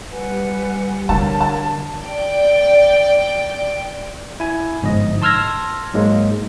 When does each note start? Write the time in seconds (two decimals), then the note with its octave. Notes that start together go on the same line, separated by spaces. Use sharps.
0.11 G3 B4 F#5 G#5
1.09 D3 D4 A#4 C#5 A5
1.40 A5
2.01 D5 G5
4.40 E4 G#5
4.82 G1 G#2 F3 D#5
5.22 A5 C6 E6 F6 G#6 A#6
5.94 G#2 F#3 G#3 A#3